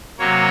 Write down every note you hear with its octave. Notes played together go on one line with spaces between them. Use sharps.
C3 F#3 A#3 C#5